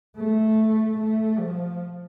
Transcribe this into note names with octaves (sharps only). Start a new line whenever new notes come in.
A3
A3
F3